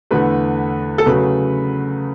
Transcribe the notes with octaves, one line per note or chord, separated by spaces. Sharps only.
E2 D3 A3 B4
A4
C#3 F#3 A3 B4